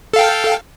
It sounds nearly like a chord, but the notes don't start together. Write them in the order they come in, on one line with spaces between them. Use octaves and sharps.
A4 F5 G5